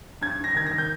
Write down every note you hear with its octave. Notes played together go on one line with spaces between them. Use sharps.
G2 G#6
G2 A#6
D#3 G#6
D#3 A#6
G6